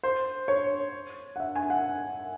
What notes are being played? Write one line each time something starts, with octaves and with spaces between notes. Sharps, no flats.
C5
C#5
F#5
E5
G#5
F#5